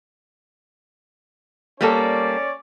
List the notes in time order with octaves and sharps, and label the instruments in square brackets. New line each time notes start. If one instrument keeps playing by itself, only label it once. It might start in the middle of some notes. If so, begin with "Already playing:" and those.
[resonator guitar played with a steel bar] G3 A#3 A4 [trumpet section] C#4 C#5 D5